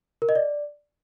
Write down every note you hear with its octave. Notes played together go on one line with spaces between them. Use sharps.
A#4
D#5
D5